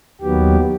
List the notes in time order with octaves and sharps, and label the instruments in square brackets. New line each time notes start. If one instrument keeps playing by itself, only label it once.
[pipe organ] D#2 D#3 F#3 B3 G4